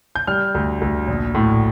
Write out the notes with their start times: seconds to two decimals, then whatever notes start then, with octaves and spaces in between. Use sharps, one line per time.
0.16 G6
0.27 G3 F6
0.54 D2
0.81 D2
1.08 A#1
1.35 A2